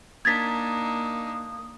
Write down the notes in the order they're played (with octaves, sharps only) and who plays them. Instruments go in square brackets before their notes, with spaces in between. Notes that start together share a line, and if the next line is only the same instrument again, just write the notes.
[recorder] A#3 [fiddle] D4 D#4 [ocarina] D#6 [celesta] G#6 A6 B6